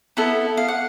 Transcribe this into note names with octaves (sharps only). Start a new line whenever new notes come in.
B3 E4 A4
F5
F#5